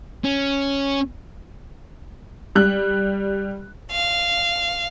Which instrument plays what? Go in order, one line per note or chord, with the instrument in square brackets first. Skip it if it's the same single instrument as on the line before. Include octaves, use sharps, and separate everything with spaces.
[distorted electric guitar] C#4
[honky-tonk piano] G3 F#6
[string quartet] F5